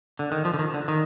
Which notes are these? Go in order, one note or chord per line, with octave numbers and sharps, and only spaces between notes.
D3
D#3
F3
D3
D#3
D3
D#3